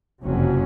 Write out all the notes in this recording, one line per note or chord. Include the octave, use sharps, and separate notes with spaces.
F#1 F2 C3 F#3 C#4